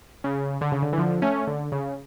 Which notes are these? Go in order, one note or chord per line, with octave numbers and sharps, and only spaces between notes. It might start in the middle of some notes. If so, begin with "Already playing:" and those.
C#3
D3
C#3
D3
E3
D3 F3
A3 C#4
D3
C#3